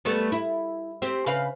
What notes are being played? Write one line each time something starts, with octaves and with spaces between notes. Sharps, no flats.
G3 A3 B3
E4
C4 G4
C#3 B4 F5